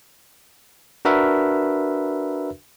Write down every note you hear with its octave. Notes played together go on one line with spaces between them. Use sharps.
D4 F#4 A#4 B4 E5